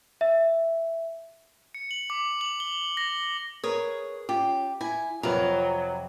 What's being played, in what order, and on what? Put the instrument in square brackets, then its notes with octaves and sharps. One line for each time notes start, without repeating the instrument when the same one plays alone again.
[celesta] E5
[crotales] C#7
F#7
D6
F#7
G7
A#6
[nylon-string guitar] G#4 A#4 B4 [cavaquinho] C#5
[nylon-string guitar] C#4 F4 [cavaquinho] G4
[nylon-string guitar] E4 [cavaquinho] G#5
[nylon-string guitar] F2 C3 F4 [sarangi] F#3 [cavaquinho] A#4 B4